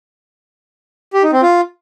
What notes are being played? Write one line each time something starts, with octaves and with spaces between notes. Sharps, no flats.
G4
D#4
C4
F4